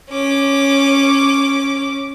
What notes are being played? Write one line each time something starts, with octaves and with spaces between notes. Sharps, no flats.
C#4 D6